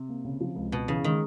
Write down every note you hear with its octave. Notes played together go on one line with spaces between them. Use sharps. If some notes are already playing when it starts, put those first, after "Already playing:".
Already playing: C3
A#3
C#3
F3
C#2
B2 B3
C#3 E3
D#3 G#3